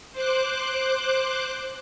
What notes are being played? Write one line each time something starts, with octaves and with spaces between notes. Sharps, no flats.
C5 D6 F#6